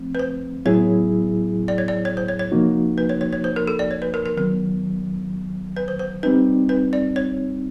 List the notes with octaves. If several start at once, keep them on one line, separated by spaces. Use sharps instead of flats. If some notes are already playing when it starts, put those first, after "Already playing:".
Already playing: F3 A3 C4
B4
C5
A2 F#3 B3 E4 G#4 C#5
D5
C#5
D5
C#5
C5
C#5
C#5
C3 F3 A#3 D#4 F#4
B4
C#5
C#5
C#5
C5
A#4
A4
D5
C#5
B4
A#4
A#4
D#3 F#3 B3 A#4
B4
C5
C5
G3 C4 D#4 B4
B4
D5
C#5